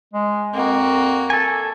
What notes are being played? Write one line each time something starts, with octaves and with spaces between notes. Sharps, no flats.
G#3
F2 A#3 F#4
A4 G#5